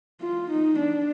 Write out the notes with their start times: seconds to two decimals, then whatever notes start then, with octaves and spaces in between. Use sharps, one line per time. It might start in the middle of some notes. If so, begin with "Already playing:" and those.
0.22 F4
0.51 D#4
0.80 D4